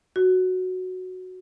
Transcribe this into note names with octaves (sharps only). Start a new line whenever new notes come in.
F#4